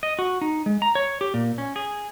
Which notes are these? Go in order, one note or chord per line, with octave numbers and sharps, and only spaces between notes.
D#5
F#4
D#4
G#3
A#5
C#5
G4
A#2
C#4
G#4